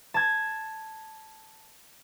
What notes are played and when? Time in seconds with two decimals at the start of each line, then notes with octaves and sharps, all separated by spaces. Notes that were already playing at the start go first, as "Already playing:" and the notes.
0.14 A5 G#6